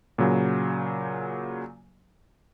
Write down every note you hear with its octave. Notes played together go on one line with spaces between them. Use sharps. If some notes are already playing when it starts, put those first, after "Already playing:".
A#2 C#3 F#3